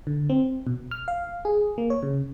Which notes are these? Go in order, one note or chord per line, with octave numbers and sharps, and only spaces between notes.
D3
C4
B2
F6
F5
G#4
A#3
C#5
C#3